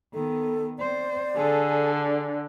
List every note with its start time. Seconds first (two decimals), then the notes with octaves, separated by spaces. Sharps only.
0.14 D#3 B3 A4
0.78 C4 C5 D5
1.37 D3 G#4 A4